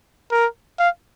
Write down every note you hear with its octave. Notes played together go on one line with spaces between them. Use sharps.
A#4
F5